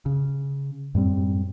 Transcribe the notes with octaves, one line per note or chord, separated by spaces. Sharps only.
C#3
F#2 A2 G3 C4